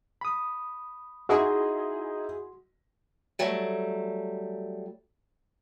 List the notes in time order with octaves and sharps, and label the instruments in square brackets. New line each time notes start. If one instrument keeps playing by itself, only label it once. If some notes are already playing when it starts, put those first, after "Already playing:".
[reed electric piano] B5 D#6
[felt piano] D#4 D#5 [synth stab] E4 G#4 [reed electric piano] F#4 C6
[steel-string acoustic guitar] F#3 G3 A3